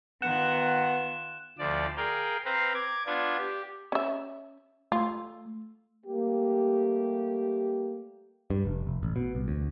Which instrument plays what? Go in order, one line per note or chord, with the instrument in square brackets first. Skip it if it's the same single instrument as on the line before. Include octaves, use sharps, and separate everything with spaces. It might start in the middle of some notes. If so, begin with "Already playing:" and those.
[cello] D#3 F4 [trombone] B3 [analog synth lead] F#5 [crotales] F#6 E7
[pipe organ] D2 F3 D5
G#4 A#4 F5 G5
C4 B4 C5 F5 A#5
D6 G#6
B3 D4 F4 G#6
G4
[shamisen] C#4 E5
[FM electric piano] A3 [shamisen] F4
[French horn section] G3 A3 G4 [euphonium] A#3
[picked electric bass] G2
F1
F1
A1
B2
C2
D2